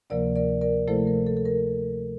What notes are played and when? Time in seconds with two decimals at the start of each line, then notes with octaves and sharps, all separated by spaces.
0.10 D2 C3 F3 A#3 A#4 D5
0.36 A#4 D5
0.61 A#4 D5
0.88 C3 F3 A3 E4 A4 C5
1.07 A#4
1.27 A4
1.37 A4
1.45 A#4